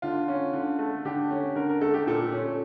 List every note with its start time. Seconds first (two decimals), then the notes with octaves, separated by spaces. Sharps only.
0.02 D3 F4
0.28 C#4
0.53 D3
0.79 A3
1.05 D3 G4
1.30 C#4
1.56 D3 A#4
1.69 A#4
1.81 A3 A4
1.94 G4
2.07 A#2 A4
2.32 C#4